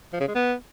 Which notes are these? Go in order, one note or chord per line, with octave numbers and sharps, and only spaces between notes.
F3
C#3
G#3
B3